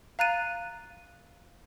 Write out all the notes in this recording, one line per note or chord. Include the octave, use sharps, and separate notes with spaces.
F5 A#5 F#6 A6 D#7